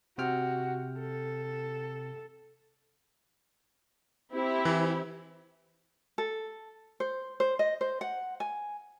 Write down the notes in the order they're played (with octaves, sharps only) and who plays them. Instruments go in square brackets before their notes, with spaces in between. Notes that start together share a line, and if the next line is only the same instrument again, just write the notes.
[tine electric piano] C3 G5 F6 [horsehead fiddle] F#4
[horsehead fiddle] A4
[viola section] C4 E4 G4
[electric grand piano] E3
[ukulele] A4
C5
C5
D#5
C5
F#5
G#5